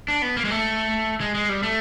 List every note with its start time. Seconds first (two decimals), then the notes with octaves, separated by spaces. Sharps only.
0.08 D4
0.22 B3
0.37 A#3
0.45 G#3
0.50 A3
1.21 G#3
1.35 G#3
1.49 G3
1.63 A3